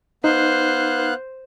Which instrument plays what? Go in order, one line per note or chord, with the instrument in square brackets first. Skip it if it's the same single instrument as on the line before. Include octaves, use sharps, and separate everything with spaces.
[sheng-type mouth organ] B3 F5 F#6 [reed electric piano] D#4 [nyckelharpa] C5